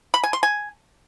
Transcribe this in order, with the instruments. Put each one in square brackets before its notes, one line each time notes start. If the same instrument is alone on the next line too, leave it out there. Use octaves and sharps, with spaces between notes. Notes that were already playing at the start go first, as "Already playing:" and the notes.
[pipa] B5
G#5
C6
G#5